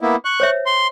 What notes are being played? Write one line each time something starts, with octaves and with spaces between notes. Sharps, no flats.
A#3 B3 E4
C#6 F#6
C5 C#5 E5
C6